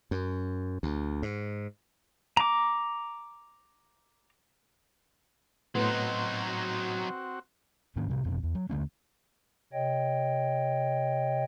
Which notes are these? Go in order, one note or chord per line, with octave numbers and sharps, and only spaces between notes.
F#2
D2
G#2
A#5 D6
A2 F#3 B3 C4 D#4 F#4 C6
G#2 D#3 A#3 C#4
A2 C3 G3
F1 F2 B2 C4
E2
F#3
D#2 D3 A3 C#4
C3 C#5 D#5 G5